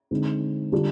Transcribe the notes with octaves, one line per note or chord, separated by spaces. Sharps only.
D3 G#3 C4 D#4
D3 G3 D4 F4